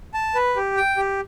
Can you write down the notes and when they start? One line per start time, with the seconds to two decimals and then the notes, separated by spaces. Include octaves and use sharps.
0.14 A5
0.35 B4
0.56 G4
0.77 G5
0.97 G4